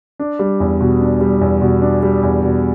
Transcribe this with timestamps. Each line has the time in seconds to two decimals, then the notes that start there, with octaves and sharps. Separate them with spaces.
0.19 D4
0.39 G3
0.60 E2
0.81 B2
1.01 D4
1.21 G3
1.41 E2
1.61 B2
1.82 D4
2.03 G3
2.23 E2
2.43 B2